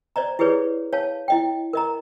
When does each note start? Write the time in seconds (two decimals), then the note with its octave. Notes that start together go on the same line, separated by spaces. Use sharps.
0.16 C5 D5 D#5 A#5
0.39 E4 G4 G#4 B4 C#5 D5
0.93 C#5 F5 A5
1.28 E4 D#5 G5
1.73 A#4 D#5 A#5